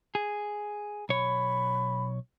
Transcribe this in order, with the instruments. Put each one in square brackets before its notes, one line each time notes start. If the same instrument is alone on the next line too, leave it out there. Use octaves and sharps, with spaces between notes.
[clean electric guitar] G#4
[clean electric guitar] B1 C#5 [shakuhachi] B5